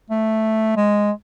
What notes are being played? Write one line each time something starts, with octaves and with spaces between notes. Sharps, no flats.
A3
G#3